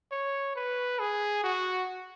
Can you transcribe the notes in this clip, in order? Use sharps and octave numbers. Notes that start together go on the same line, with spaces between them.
C#5
B4
G#4
F#4